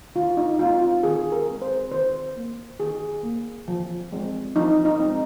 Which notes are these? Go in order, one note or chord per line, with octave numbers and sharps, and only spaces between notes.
D#3 F4
D#4
G#3 C4 F4
F4
D#3 G#4
A#4
G#3 C4
C5
D#3 C5
A#3
D#3 G#4
A#3
F3
G#3 C4
F3 D#4
D#4
G#3 C4